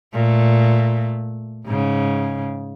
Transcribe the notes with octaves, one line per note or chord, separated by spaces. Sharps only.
A#2 A3
G#2 C#3